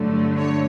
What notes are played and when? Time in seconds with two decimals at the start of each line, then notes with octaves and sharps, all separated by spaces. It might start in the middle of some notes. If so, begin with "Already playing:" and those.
Already playing: G2 D3 F#3 A3
0.38 C#5